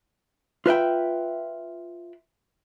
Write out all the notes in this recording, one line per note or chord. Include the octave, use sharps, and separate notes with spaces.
F4 B4 E5 G5